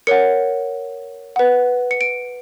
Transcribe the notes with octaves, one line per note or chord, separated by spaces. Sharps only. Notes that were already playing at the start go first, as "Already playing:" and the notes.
A#4 C#5 F#5 C#7
B4 F#5
C#7
D7